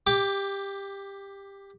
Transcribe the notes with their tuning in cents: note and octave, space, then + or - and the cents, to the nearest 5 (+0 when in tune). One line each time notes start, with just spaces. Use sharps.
G4 +15 D6 +0